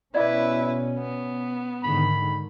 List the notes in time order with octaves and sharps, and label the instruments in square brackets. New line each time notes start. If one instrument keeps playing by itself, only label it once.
[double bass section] B2 C#4 [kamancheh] E4 B4 [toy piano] D5 D#5 D6
[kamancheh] B3
[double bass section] G#2 D3 D#3 [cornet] B5